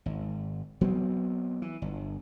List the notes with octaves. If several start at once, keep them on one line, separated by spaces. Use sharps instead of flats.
G#1
F#3 B3 C4
E3
G1